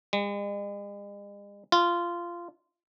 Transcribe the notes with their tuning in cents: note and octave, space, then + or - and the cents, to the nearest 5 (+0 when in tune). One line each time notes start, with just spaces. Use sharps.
G#3 -45
F4 -15